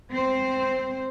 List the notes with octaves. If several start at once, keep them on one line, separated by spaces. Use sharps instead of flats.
C4 C5